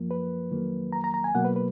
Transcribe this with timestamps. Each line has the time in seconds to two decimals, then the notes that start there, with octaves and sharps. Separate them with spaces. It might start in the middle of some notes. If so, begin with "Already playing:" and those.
Already playing: F#2 F3 A#3
0.11 B4
0.51 F2 D#3 F#3 A#3
0.93 A#5
1.04 A#5
1.14 A#5
1.24 G#5
1.35 B2 F#3 A#3 F#5
1.45 B4
1.56 B4